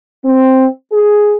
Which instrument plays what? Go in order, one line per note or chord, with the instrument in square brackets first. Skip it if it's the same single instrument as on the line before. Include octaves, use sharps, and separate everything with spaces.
[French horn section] C4
G#4